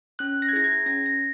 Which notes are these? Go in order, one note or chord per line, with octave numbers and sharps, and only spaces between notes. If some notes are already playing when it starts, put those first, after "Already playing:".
C#4 F#6
A#6
G#6
E4 G#4 A#6
G#6
C#4 A#6
A#6